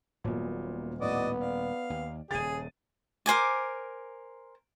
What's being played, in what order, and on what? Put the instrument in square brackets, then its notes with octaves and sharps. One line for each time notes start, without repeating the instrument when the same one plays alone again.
[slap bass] D#1 [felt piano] A#2 F#3 B3
[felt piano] A2 [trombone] B3 [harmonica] F#4 D5 D#5
[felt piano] D5 [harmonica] F5
[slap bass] D#2
[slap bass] D#1 C#3 [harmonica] G#4 [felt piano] A6 D#7
[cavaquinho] A#4 C5 G#5 D6